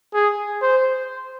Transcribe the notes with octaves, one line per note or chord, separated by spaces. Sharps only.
G#4
C5